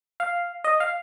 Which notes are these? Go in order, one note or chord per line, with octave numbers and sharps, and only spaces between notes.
F5
D#5
F5